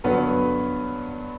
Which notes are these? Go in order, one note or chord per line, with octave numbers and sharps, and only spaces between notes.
G2 D3 F#3 B3 B4